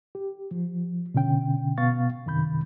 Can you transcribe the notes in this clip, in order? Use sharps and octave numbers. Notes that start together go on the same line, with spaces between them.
G4
F3
B2 D3 C#4 G5
B2 B3 F5 C#6 A6
F#2 C3 D#3 B5 G6